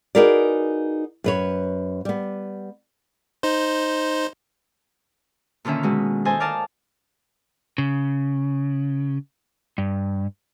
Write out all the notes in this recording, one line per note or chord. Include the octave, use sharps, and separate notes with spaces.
D#4 F#4 G#4 A#4 B4 D5
F#2 B4 C#5
G3 B3
D#4 C5
A#2 D3 D#3 C#4 E5
B2 G#3
A4 C5 D#5 G#5
A#4 D5 D#5 F5 A5
C#3
G2